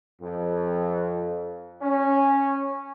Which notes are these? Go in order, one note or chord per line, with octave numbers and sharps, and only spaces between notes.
F2
C#4